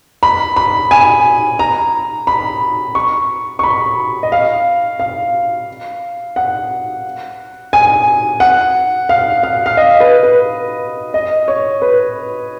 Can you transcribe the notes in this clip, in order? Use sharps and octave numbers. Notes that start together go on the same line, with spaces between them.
B5
B5
G#5
A#5
B5
C#6
C#6
B5
D#5
F5
F5
F#5
G#5
F#5
F5
F5
F5
D#5
B4
B4
D#5
C#5
B4